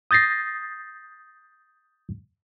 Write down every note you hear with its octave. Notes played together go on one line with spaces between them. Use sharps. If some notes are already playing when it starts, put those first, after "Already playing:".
D#6 G6 A6 A#6 C7